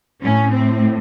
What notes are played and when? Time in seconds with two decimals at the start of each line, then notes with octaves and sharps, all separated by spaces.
0.22 A2 C#4
0.52 C4